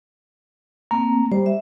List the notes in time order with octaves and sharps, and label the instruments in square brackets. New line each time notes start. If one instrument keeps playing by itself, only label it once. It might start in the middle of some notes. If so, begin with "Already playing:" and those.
[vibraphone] A3 A#3 C4 [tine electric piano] A#5
[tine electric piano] G3 [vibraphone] C5
[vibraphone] E5